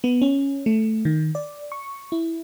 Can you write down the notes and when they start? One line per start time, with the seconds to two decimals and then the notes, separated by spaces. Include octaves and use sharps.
0.04 B3
0.22 C#4
0.66 A3
1.05 D#3
1.35 D5
1.72 C#6
2.12 E4